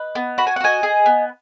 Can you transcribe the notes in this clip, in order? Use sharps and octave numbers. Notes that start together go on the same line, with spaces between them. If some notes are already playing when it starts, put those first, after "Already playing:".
Already playing: B4 D#5
B3
F#4 B5
G#5
F#5
F#4 D#5 G#5
G#4
B3